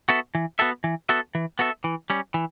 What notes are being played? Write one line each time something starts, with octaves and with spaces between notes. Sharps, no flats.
B3 F#4 A4 E5
E3
B3 F#4 A4 E5
E3
B3 F#4 A4 E5
E3
B3 F#4 A4 E5
E3
G3 C#4
E3